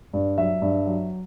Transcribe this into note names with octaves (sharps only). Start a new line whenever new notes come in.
G2
F#3 E5
G2
F#3